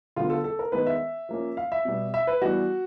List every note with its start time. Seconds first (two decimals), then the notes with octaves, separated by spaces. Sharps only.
0.16 D3 F#3 B3 F4
0.30 A4
0.44 A4
0.59 A#4
0.72 D#3 G#3 B3 B4
0.87 E5
1.29 F3 A#3 C#4
1.57 F5
1.72 E5
1.85 B2 G3 B3
2.14 E5
2.27 B4
2.41 E3 G3 B3 F#4